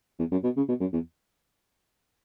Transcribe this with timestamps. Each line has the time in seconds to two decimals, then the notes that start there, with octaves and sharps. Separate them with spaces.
0.19 E2
0.31 F#2
0.44 B2
0.57 C#3
0.68 B2
0.80 F#2
0.93 E2